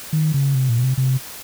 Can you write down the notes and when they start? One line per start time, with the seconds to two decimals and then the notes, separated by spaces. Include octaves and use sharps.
0.13 D#3
0.34 C#3
0.55 C3
0.69 A#2
0.78 B2
0.84 C3
0.98 C3